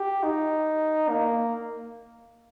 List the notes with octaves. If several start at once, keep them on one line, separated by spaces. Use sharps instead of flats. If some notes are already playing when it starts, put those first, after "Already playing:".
Already playing: G4
D#4
A#3